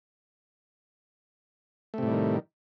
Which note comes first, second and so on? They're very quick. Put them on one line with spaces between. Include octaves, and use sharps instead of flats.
A3 C3 A2 G3 D#3